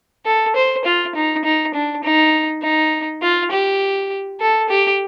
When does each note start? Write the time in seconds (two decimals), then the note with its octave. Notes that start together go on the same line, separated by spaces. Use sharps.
0.26 A4
0.56 C5
0.85 F4
1.16 D#4
1.45 D#4
1.74 D4
2.04 D#4
2.62 D#4
3.22 F4
3.51 G4
4.41 A4
4.70 G4